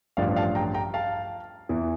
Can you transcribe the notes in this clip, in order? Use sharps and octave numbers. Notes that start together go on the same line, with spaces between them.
A1 G2 F3 D5 F5
F5 A5
G5 A#5
G5 A#5
F5 A5
E2 E3